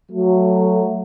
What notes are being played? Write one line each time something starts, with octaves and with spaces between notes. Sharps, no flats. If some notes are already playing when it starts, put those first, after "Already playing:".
F#3 A3